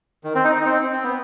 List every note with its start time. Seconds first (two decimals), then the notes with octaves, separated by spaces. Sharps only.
0.24 D#3
0.35 C4
0.44 D#4
0.56 D#4
0.65 C4
0.93 C4
1.03 B3